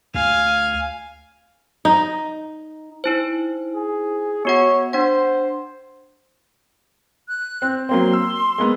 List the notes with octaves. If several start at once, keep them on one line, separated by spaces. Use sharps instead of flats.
D2 F5 G#5
D#4
D#4 E4 C5
G#4
B3 F#4 C#5 F#5
D4 C5 F#5
F#6
C4
F#3 A#3 C4 C6
E6
G#3 A#3 B3